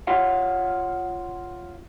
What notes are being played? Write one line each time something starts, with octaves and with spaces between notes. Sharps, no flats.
F4 C#5 F5 F#5